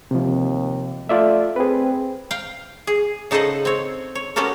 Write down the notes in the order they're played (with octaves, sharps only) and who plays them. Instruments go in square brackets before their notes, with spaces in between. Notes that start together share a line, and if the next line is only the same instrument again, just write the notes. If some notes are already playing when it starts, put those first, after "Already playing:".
[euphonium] D#2 [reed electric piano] C3 F3
[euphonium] A3 [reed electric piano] F4 D5 E5
[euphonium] C4 [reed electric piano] G#4 B4
[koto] F5 G5
G#4
C#3 D#4 A4 C5 D#5 F#5
C4 C#5
C#5
B3 C#4 F#4 G4 A4 A#4